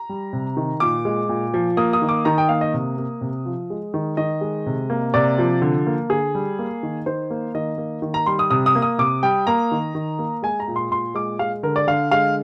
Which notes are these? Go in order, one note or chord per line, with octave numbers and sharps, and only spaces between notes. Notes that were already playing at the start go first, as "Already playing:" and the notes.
Already playing: A#5
G3
C3
D#3
A#2 D6
G#3
A#2
F3
A#3 D#6
D#6
D#3
D6
D#3 A#5
G5
A#3 F5
D#5
C3
A#3
C3
F3
G#3
D#3
D#3 D#5
G#3
C3
A#3
C3 D5
F3
D3
A#3
D3 G#4
G3
A#3
D#3
D#3 C5
A#3
D#3 D#5
A#3
D#3
A#5
G3 C6
D#6
C3 D#6
D#6
A#3
D#6
C3 D6
G3 G5
A#3 A#5
D#3
D#3
A#3
G#3 G#5
A#5
A#2
C6
A#2 C6
G#3 D6
G#3 F5
D3 A#4
D5
D3 F5
G#3 F5